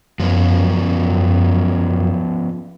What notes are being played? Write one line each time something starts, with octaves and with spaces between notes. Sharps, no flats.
F#2 F3 B3 C#4